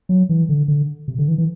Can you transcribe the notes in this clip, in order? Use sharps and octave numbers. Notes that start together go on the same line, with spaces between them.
F#3
E3
D3
D3
C3
D3
E3
E3